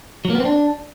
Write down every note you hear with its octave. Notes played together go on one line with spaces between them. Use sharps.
F#3
A#3
B3
C4
D4